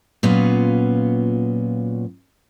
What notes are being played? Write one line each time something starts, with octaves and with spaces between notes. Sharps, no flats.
A#2 F#3 B3 C#4 F4